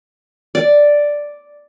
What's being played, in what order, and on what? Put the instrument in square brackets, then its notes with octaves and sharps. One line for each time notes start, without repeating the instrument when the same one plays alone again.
[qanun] D5